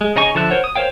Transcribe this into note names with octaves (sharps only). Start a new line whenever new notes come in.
G#3
C#3 D#4 D#5 G#5 C#6
D3 F3 A4 E5 F#6
A#4 C5 C#5 F#5
D#6
A#4 C5 C#5 F5 G5